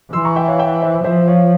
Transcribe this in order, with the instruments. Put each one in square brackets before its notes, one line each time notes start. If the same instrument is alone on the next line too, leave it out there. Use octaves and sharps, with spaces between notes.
[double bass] E3 [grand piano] C6 E6
[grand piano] A#5 C#6
E5 G5
C#5 F5
E5 G5
C5 E5
[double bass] F3 [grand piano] C5 E5
[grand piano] C#5 F5